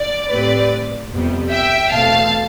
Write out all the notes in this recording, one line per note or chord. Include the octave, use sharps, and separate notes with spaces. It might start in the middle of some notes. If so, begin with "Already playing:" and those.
Already playing: D5
A2 G3 C4 B4 D5
F2 C3 G3 B3
E5 G5
E2 B2 A3 C4 F5 A5